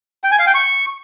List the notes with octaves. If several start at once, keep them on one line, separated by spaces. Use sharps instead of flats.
G5
G#5
F5
G5
C#6